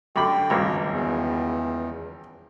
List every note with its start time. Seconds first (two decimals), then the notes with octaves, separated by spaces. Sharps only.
0.16 F#2 D3 G4 G5 B5
0.50 G#1 C#2 G2 A#3
0.90 E2